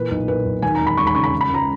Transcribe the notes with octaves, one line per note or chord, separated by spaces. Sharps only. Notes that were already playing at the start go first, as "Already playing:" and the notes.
Already playing: A#2 E3 B4
B1
A#2 B4
B1
D#2 G#5
A#5
E1
B5
E1 C#6
B5
C#3 C#6
B5
C#3
B5
C#2 A#5